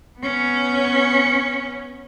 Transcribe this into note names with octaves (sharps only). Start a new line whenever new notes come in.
B3 C#4